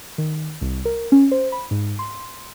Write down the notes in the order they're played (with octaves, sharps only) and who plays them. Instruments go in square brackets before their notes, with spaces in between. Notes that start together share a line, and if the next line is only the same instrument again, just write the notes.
[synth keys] D#3
C2
A#4
C#4
C5
B5
G#2
C6